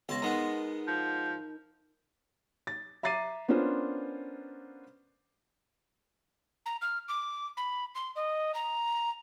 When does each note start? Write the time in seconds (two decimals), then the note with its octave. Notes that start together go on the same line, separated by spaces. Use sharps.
0.09 C#2 B3 A5 C6 A#6
0.22 G#3 B3 D#4 A#4 A#5
0.87 F3
2.67 A6
3.03 E5 A#5 D6 A6 C7 D#7
3.48 B3 C#4 D4 F4 A#4 C5
6.66 A#5
6.82 F6
7.08 D6
7.57 B5
7.95 C6
8.16 D#5
8.54 A#5